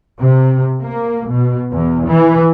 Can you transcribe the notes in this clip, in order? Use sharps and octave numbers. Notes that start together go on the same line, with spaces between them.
C3
A#3
B2
E2
E3